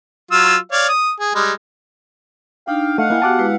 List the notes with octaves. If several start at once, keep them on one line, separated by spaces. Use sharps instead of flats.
F#3 F4 E6
C#5 D5 F5
D#6
G#4
G3 G#3
D4 D#4 F5 G5
A3 D#5 F5 F#5
A#3 E4 G5 G#5
B3 F#4 G4 A5 D6 F#6
G#3 E4 B4